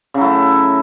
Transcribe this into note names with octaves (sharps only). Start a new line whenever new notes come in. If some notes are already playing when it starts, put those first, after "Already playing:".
C#3 F#3 A3 E4